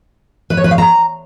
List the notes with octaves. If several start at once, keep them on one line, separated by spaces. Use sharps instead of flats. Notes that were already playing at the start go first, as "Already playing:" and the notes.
B4
C#5
B4
F5
A#5